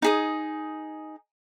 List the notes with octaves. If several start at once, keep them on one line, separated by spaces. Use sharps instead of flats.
D#4 G#4 D#6